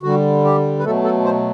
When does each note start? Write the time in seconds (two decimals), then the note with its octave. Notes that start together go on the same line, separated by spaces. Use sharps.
0.03 D3 G3 F#4
0.44 G4
0.79 B4
0.84 B2 F#3 A3 A4
1.04 A4
1.24 C5